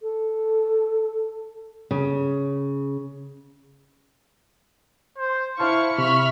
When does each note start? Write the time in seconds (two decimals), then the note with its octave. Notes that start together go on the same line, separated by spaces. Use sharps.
0.02 A4
1.91 C#3
5.18 C5
5.60 E4 C5 F5 A5 C6 C#6 C#7
5.98 C3 E5 B5 C#6 F6